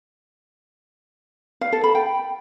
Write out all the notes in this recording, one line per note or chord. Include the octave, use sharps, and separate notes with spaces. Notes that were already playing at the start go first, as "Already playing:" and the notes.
F5
A4
B5
G5